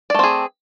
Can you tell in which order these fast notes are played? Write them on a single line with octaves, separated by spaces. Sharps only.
D5 A3 C4 G#4